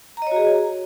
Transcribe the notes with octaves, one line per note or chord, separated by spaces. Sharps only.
F#4 G#4 C#5 D#5 A#5